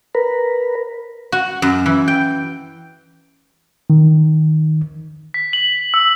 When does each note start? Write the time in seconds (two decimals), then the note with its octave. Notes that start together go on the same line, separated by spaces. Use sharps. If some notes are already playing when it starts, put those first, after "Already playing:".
0.15 A#4 B4
1.32 F#4
1.62 F#2
1.86 E3
2.08 G5
3.90 D#3
5.34 B6
5.53 F#7
5.94 E6